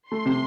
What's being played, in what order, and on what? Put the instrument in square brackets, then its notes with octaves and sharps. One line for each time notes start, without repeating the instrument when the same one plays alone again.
[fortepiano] A3 [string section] C6
[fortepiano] C3